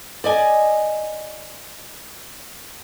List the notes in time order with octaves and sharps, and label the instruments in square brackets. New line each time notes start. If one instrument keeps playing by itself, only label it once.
[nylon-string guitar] D5 D#5 G#5